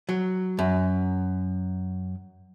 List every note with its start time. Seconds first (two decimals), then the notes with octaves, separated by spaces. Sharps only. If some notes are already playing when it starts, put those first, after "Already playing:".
0.09 F#3
0.59 F#2